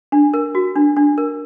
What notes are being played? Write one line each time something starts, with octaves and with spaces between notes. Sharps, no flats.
D4
A#4
F#4
D4
D4
A#4